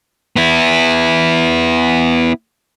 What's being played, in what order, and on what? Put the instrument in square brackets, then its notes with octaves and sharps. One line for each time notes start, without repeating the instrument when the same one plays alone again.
[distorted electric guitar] B3 E4